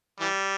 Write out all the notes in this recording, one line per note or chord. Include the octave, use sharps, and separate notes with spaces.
E3 G3